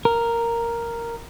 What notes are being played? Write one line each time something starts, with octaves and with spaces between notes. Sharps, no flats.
A#4